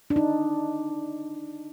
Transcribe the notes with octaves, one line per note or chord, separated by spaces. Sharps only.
D4
D#4